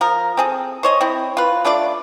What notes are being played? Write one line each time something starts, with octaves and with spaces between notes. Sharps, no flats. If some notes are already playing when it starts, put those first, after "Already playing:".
F3 A#4
C4 G#4 A4
C5 C#5 D#5
C4 E4
F4 B4
A3 D4 F4 D5